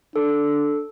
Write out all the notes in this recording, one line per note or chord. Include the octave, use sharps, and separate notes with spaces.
D4 A4